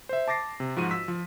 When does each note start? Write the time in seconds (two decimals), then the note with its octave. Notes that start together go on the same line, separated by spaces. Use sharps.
0.09 C5 E5
0.28 A5 D6 A6 A#6 C7
0.60 C3
0.76 G#2 F3 F#4 D#7
0.91 E6 B6
1.08 F3